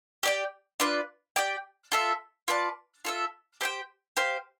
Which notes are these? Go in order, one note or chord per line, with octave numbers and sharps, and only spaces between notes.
G4 D5 G5
D4 F4 B4 D5
G4 D5 G5
F4 A4 E5
F4 B4 D5 A5
F4 A4 E5
G4 C5 E5 G5
G4 C5 F5